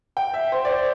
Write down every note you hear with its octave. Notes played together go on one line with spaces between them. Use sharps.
G5
E5
C5
D5
C5